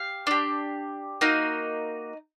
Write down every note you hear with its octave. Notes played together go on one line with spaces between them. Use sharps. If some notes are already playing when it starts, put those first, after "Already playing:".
Already playing: G4 F5
D4 G4
A#3 D#4 F#4